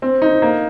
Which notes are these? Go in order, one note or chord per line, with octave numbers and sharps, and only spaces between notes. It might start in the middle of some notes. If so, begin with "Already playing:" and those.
C4
D#4
A#3